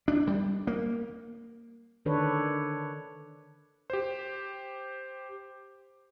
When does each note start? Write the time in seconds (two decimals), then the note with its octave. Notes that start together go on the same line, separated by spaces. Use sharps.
0.08 D4
0.27 G3
0.67 A#3
2.05 D3 D#3 D4 A4 B4 C#5
3.90 G4 C5